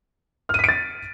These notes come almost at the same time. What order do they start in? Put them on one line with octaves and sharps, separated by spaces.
F6 D#7 B6 D7 A6